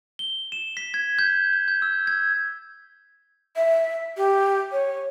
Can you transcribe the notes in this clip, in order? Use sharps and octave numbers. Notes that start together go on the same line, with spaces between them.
G7
E7
B6
G#6
G6
G6
G6
E6
G#6
E5
G4
C#5